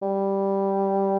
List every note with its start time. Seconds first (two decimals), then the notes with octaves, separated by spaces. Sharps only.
0.02 G3